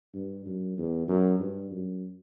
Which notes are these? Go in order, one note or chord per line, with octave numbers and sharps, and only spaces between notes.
G2
F#2
E2
F#2
G2
F#2